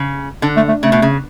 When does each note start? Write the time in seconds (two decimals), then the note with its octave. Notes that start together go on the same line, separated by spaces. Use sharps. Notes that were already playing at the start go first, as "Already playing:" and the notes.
Already playing: C#3
0.42 D3 D4
0.56 A3
0.68 A3
0.82 C#3 A3
0.92 B2
1.02 C#3